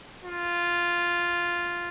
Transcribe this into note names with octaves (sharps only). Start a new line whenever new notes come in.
F4